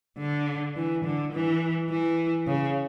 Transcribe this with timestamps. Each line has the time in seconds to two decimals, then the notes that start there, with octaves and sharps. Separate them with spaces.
0.18 D3
0.76 E3
1.04 D3
1.33 E3
1.90 E3
2.47 C#3